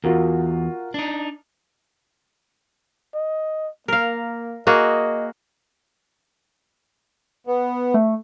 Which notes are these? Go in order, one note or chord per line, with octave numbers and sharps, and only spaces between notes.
E2 F4 F#4 A#4
D4 D#4
D#5
A#3 A#4 F5
A#3 F#4 G#4 D#5
B3
A3